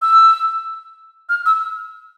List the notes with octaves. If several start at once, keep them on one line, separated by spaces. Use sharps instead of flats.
E6
F6
E6